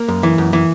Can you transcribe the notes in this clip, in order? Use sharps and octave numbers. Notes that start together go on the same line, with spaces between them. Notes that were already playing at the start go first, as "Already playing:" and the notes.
Already playing: A#3
F#2
E3
F#2
E3